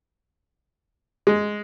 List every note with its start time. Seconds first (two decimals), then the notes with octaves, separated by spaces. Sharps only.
1.27 G#3